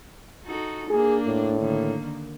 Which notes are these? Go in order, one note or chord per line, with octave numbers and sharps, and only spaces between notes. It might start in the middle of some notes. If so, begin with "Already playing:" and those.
D#4 F#4 A4
A#3 D4 G#4
A2
D3 D#3 A#3